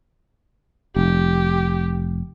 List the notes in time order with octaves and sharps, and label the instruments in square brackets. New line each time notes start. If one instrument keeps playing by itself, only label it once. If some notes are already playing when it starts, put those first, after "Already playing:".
[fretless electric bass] F1 [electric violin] G4